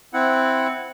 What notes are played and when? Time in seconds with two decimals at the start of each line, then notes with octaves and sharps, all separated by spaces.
0.13 C4 E4 F#5